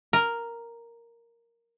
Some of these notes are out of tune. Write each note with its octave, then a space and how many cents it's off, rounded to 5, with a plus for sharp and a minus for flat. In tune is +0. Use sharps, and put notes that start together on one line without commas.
A#4 +0